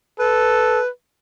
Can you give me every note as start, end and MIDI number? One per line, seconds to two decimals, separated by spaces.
0.19 0.81 69
0.19 0.88 71